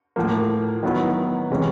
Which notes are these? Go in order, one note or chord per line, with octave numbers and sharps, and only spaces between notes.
A2 F3 A#3
D#3 F#3 B3 E4
C3 E3 G#3 C#4